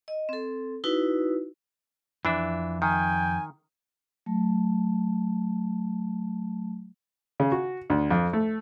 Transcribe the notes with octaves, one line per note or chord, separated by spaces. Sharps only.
D#5
C4 A4
D#4 E4 F#4 B4
F2 E3 D4 E5
D#3 G5 G#5
F#3 A3 A5
C#3
F#4
D2
F2
A3